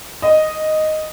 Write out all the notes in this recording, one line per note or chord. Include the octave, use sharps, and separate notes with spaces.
D#5